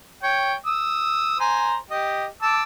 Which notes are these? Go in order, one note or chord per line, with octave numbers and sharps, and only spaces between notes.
C#5 G5
D#6 E6
C5 G#5 A#5
G4 D#5
A5 D6 E6